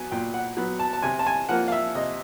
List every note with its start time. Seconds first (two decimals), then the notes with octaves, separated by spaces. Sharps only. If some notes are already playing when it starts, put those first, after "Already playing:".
Already playing: F#3 B3 G#5
0.11 A#2 G5
0.34 F#5
0.57 F#3 B3
0.79 A5
0.93 A5
1.02 C3 G#5
1.19 A5
1.26 G#5
1.49 F3 A#3 F#5
1.68 F5
1.72 E5
1.95 C3 D#5